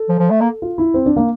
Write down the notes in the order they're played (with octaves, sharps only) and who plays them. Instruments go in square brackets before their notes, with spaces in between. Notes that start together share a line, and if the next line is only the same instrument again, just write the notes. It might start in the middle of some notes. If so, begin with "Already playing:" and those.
Already playing: [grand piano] A4
[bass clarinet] F3
F3
A3
A#3
[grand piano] F4
E4
C4
D4
A#3